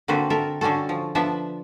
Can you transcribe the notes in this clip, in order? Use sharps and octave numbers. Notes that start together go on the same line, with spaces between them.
D3 A#3 C4 F#4 A4 B4
A4 A#4 E5
D3 G3 C#4 F#4 A4
F3
F3 B3 D4 E5 A5